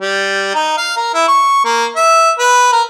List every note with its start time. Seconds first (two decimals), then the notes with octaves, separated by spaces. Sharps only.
0.01 G3
0.54 D#4
0.77 F5
0.97 A#4
1.14 E4
1.28 C#6
1.65 A#3
1.96 E5
2.39 B4
2.72 A#4